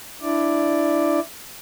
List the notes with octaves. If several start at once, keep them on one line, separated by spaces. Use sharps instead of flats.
D4 E4 D5